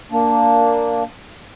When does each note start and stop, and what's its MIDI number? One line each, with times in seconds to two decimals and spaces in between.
0.12 1.03 58
0.12 1.03 62